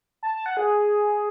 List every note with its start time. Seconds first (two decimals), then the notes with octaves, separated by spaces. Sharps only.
0.23 A5
0.34 A5
0.46 F#5
0.57 G#4